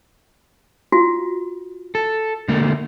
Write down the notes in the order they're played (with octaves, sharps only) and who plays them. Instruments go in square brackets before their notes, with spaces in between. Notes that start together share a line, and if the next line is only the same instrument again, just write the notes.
[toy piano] F4 F#4
[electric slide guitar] A4
D3 A3 A#3